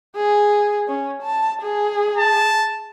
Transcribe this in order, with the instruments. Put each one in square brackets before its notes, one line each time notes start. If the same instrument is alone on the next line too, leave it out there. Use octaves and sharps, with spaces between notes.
[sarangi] G#4
C#4
A5
G#4
[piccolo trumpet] A5